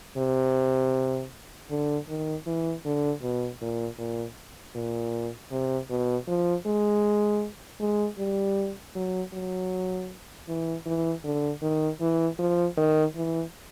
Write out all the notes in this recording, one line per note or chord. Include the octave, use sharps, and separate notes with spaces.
C3
D3
D#3
E3
D3
B2
A#2
A#2
A#2
C3
B2
F3
G#3
G#3
G3
F#3
F#3
E3
E3
D3
D#3
E3
F3
D#3
E3